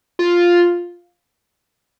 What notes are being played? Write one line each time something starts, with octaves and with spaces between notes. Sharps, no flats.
F4